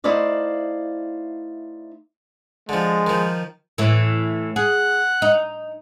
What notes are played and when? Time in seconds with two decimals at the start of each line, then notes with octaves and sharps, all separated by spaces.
0.04 A3 D#4 E4 C5 D5 F5
2.69 D3 F3 G#3
3.07 D#3 F3
3.78 A2 E3
4.56 G#4 F#5
5.22 D#4